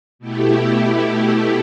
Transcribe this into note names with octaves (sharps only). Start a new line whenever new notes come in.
B2 A3 E4 G4